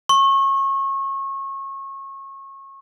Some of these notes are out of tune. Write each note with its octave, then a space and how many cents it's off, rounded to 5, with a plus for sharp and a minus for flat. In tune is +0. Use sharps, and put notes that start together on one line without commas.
C#6 -30